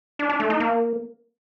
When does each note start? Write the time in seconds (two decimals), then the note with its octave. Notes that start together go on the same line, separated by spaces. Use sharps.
0.19 D4
0.30 D4
0.40 A3
0.50 D#4
0.60 A#3